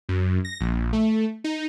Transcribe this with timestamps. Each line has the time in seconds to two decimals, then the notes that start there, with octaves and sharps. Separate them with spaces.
0.09 F#2
0.45 A#6
0.60 A#1
0.93 A3
1.44 D#4